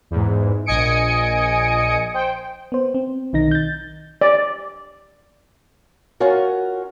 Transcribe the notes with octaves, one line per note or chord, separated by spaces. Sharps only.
E2 G#2
A#1 D#5 G#5 D#6 C#7 D7
C5 G5
B3 C5
C4
B1 D#3 D#4 A#6
G6 A6
D5
C#4 F4 F#4 A#4